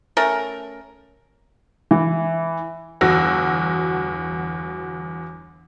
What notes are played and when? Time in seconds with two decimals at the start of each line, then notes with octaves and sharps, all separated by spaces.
0.17 A3 C#4 A#4
1.91 E3
3.01 G1 E2 F#4 E6 A#6